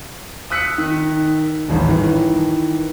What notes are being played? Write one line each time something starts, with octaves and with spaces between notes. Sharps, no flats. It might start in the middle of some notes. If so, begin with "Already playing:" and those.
D#6 E6 F#6 B6 C#7
D#3
D#1 A1 G2
D#3 E3